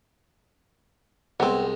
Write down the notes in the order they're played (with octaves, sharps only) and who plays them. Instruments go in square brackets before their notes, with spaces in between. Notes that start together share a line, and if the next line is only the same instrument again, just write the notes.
[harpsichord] C2 G#3 [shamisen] B3 C4